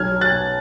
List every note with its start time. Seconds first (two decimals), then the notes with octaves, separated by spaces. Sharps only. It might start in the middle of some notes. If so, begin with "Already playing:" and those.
Already playing: B1 F#3 F6 G#6
0.12 F#3
0.21 F#6 A6
0.32 B2